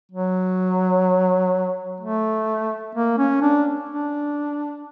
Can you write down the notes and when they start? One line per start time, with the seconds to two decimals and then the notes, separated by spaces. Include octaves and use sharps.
0.12 F#3
2.00 A3
2.95 A#3
3.18 C#4
3.42 D4
3.89 D4